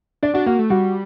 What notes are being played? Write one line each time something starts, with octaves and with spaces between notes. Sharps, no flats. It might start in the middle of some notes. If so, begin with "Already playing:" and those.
D4 D5
D4 F#4
A#3 F#4
A3
G3 F#4